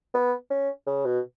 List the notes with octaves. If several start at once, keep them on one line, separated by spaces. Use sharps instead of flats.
B3
C#4
C#3
B2